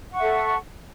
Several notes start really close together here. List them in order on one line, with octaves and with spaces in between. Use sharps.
F#5 C#6 E5 A4